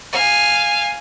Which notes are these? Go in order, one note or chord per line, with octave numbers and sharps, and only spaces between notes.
F5 G#5